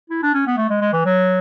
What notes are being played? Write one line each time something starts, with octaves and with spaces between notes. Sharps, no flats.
E4
D4
C#4
B3
A3
G#3
G#3
E3
F#3